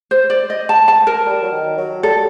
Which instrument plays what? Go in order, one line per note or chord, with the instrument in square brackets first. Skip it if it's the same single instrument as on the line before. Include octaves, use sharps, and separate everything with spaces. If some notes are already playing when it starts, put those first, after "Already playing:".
[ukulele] C5
D5
D#5
A5
A5
A#4
[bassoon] G3
F#3
D#3
F#3
[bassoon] G3 [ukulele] A4